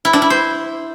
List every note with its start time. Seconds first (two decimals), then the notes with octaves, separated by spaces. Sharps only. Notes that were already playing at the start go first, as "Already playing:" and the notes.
0.05 E4
0.13 D4
0.22 E4
0.30 C5